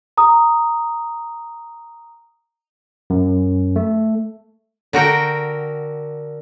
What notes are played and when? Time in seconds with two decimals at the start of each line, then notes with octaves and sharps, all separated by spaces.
0.18 A#5 D#6
3.10 F#2
3.76 A3
4.93 D3 F#4 A#4 G5